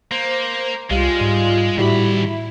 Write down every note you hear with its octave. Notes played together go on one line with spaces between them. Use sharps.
A#3 C5
C2 G3 G#3 F4
G#2
A2 D#3 G3 E4 F#4 G4 B5